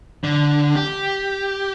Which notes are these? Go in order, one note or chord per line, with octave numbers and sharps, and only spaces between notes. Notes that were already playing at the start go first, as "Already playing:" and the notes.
D3
G4